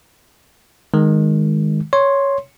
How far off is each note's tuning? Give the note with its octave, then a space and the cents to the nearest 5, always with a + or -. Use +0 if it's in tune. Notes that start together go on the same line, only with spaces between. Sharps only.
D#3 +0 G#3 +0
C#5 +0 C6 +10